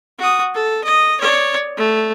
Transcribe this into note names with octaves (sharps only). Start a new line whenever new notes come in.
F#4 D#6
A4
D#5
C#5 D5
A3